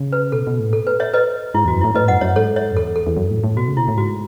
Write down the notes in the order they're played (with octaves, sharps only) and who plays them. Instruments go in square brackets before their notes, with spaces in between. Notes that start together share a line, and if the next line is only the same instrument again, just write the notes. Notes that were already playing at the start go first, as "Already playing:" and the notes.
Already playing: [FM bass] C#3
[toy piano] B4
[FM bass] B2 [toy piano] A4
[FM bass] B2
A2
[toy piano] A4
B4
C#5 E5
B4 D#5
[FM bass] G#2 [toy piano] E4
[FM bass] E2 [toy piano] F#4
[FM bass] F#2
[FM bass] A2 [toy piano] E4
[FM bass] A2 [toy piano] B4 D#5
[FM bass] F#2 [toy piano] D#5 F#5
[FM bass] F#2 [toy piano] C#5 E5
[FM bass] G#2 [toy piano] A4 C#5
[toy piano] C#5 E5
[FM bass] F#2
[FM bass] E2 [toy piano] A4
[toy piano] A4
[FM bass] E2
F#2
A2
A2
[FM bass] B2 [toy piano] F#4
[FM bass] C#3
[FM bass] B2 [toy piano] E4
[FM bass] A2
[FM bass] G#2 [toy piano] F#4